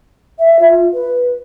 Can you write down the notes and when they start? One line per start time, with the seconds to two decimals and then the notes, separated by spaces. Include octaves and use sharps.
0.39 E5
0.59 F4
0.93 B4